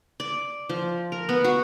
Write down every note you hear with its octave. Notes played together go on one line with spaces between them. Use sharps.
D5
F3
A#4
B3
F#4